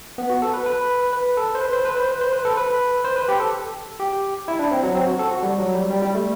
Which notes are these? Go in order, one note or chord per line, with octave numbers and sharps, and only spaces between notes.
B3
F#4
A4
B4
B4
B4
A4
C5
B4
C5
B4
C5
B4
C5
B4
A4
B4
C5
B4
G4
A4
G4
E4
D4
C4
F#3
C4
F#4
A4
F#4
G3
F#3
G3
G3
G3
A3